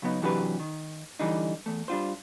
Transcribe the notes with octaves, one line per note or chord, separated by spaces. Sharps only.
C#3 F#3 B3 D#4
C3 E3 F#3 D4 G4 B4
D#3
D3 E3 G3 D4 D#4
E2 A3
G3 D4 F4 C5